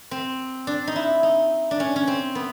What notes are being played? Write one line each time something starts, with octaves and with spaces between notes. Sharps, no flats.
C4
D4
D#4
E4
D#4
D4
C#4
C#4
C4
B3